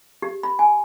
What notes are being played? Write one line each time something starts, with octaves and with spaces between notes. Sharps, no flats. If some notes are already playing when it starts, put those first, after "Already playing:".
G4
B5
G#5